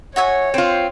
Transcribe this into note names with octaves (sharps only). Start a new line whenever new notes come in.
F#4 C#5 E5 G#5
C4 F4 C5